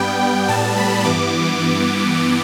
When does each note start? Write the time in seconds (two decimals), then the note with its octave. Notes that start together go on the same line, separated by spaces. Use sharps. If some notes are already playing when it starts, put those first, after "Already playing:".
Already playing: G2 G3 B3 G5
0.48 A2 G3 B3 A5
0.77 B5
1.04 G2 E3 B3 D6